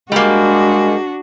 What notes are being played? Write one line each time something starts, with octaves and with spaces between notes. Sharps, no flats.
G3 G#3 A#3 D4 F#4